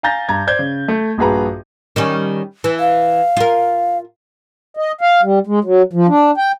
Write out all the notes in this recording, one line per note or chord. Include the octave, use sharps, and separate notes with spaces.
F5 G#5 A#5 G6 A6 A#6
G2 A#5 G#6
C5 D5 G6 G#6
C#3
A3
A#1 G2 F#4 G#4 B4 A#5
D#3 G3 C#4
E3
F5
F4 A#4
D#5
F5
G3
G#3
F#3
F3
D4
G5